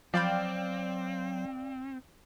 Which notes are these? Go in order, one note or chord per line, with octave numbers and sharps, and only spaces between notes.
F3 F#3 C4 D5 F5 G5 B5